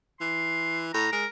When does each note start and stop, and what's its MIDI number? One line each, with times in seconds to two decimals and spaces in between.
0.20 0.89 52
0.20 0.84 84
0.94 1.11 45
0.94 1.12 82
1.12 1.25 56
1.12 1.26 70